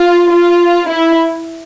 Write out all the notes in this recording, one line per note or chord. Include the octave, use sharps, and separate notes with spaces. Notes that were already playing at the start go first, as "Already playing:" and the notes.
Already playing: F4
F4
E4